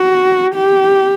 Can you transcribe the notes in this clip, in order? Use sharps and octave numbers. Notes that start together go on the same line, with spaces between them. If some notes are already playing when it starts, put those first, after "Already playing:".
Already playing: F#4
G4